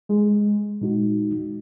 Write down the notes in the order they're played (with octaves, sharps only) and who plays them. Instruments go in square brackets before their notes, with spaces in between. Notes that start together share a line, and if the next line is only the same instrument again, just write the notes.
[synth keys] G#3
[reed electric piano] A#2 G#3 D#4 F#4